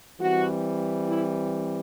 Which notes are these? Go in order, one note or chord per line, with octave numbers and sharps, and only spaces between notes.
E3 G3 C4 F#4
E4